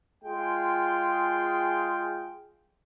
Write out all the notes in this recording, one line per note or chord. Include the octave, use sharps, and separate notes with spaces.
G#3 F4 G#4 G5